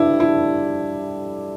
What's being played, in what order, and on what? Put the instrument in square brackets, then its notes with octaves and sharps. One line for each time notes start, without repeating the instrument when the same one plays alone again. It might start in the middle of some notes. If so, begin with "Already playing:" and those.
Already playing: [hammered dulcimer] G2 G3 D4 A4 [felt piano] E4
[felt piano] E4